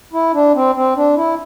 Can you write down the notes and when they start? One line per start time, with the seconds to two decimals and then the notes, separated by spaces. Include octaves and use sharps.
0.13 E4
0.34 D4
0.55 C4
0.75 C4
0.96 D4
1.16 E4